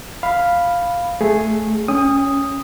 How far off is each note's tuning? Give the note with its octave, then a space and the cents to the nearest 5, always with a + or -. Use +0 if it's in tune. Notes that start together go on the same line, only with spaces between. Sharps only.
F5 +0 B5 +0
A3 -10 G#4 +0
C#4 +5 G5 +45 D#6 +0